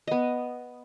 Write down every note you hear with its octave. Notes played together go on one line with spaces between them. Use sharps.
B3 D#5